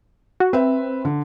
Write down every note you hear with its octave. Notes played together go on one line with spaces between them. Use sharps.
F#4
C4 B4 E5
D3